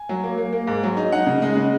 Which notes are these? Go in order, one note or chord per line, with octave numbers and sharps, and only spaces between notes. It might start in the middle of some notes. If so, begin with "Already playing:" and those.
Already playing: G#5
F#3
A#3
A#3
A#3
G#2
F#3
D#4
D#4 F#5
C#3
G#3 D#5
C#3